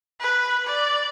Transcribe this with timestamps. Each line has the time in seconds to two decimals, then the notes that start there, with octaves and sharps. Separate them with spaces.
0.20 B4
0.66 D5